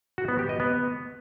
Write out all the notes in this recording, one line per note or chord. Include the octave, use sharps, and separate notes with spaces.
F#4
B3
G4
D#5
B3